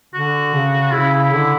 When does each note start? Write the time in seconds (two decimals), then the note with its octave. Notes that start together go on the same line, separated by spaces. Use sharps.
0.14 D3 F#4
0.54 C#3
0.93 C#3 E4
1.13 E4
1.33 D3 E4